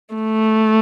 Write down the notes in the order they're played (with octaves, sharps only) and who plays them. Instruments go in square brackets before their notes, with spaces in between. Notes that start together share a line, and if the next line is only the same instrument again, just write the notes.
[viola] A3